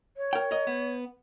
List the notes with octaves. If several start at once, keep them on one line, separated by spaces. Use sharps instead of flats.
C#5
A#4 G5
A#4 D#5
B3